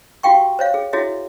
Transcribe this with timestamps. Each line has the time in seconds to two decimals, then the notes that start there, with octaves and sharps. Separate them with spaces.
0.23 F#4 G4 F5 G5 C#6
0.59 C5 C#5 F5
0.74 G#4
0.93 E4 F#4 G#4 C#5 E5